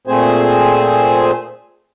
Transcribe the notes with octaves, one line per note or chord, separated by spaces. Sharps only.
A#2 A3 C4 G#4 C5 G#5